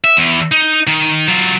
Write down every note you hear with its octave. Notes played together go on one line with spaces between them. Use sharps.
E5
E2
D#4
D#3
F#3 F4